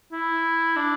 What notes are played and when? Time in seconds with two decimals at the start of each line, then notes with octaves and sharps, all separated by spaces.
0.12 E4
0.76 D4